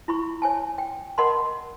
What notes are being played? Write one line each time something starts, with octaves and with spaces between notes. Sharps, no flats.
E4 B5 C#6
C#5 G#5 A5
G5
A#4 D#5 F#5 A5 B5 C6